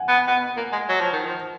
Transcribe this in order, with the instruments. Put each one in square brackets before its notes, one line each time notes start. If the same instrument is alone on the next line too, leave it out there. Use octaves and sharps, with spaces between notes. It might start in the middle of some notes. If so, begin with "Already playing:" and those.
Already playing: [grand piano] F#5 G#5
[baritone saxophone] B3
B3
A#3
G#3
F#3
F3
D#3
F3